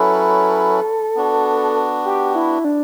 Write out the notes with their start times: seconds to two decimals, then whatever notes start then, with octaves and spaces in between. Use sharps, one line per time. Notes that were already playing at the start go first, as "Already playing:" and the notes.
Already playing: F#3 C#4 E4 A4 B4
1.15 B3 D4 F#4
2.05 G4
2.35 E4
2.65 D4